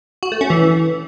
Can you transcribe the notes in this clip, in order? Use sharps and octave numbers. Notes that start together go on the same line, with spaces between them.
F#4
A3
C#4
E3